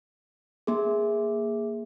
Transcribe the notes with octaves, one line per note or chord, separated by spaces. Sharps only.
A#3 G#4